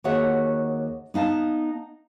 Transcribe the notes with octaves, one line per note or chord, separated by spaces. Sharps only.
D#2 F#4 G#4 C#5 E5 F#5
B3 D#4 F5 A5